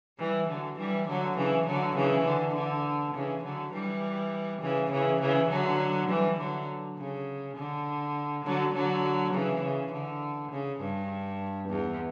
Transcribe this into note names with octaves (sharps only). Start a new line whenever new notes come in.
E3 G3
D3 F#3
E3 G3
D3 F#3
C#3 E3
D3 F#3
C#3 E3
D3
D3
C#3 E3
D3 F#3
E3 G3
C#3 E3
C#3 E3
C#3 E3
D3 F#3
E3 G3
D3 F#3
C#3
D3
D3 F#3
D3 F#3
C#3 E3
C#3
D3
C#3
G2
E2